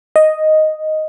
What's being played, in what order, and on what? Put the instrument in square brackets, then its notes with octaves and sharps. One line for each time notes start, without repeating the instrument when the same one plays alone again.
[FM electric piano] D#5